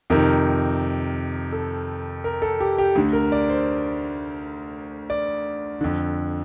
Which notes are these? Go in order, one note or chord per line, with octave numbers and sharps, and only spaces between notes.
F2 C3 D#3 A#4
A4
A#4
A4
G4
G4
D2 D3
A#4
D5
C5
D5
F2 D3